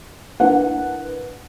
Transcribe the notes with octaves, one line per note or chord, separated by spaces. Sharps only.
D4 E4 A#4 B4 F#5